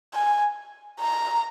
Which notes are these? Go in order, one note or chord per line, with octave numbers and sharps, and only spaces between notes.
G#5
A#5